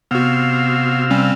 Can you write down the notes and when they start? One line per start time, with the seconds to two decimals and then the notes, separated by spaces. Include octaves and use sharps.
0.11 C3 B3 F#4 F5 E6
1.10 G3 C4 C#4